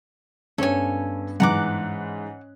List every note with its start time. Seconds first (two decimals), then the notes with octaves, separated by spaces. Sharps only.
0.58 G2 B3 C#4 A4 C#5 G#5
1.40 G#2 E3 F#5 A#5 D6 F#6